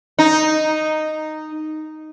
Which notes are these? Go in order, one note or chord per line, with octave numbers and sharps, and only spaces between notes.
D#4